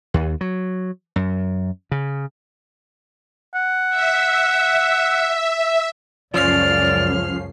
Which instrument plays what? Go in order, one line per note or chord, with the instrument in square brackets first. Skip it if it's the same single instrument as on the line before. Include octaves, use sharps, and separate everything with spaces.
[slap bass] D#2
F#3
F#2
C#3
[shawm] F#5
[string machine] E5
[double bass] C#2 F#2 [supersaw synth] F3 C#4 C7 [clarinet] D5 [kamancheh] F6